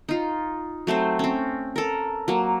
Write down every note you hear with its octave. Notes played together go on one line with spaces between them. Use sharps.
D#4 F4
F#3 A3 C4 C5
C4 C#4
A4 A#4
F#3 A#3